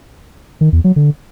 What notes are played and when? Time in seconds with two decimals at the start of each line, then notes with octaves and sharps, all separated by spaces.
0.61 D#3
0.73 E2
0.84 F#3
0.96 D3